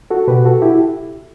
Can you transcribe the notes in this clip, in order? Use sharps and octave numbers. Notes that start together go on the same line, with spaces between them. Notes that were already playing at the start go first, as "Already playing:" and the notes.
F#4 A4
B2 G4 B4
F#4 A4
E4 G4